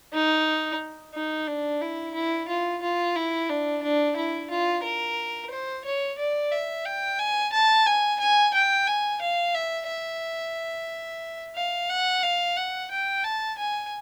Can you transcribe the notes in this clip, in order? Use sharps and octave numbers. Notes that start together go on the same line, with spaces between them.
D#4
D#4
D4
E4
E4
F4
F4
E4
D4
D4
E4
F4
A#4
C5
C#5
D5
E5
G5
G#5
A5
G#5
G#5
G5
G#5
F5
E5
E5
F5
F#5
F5
F#5
G5
A5
G#5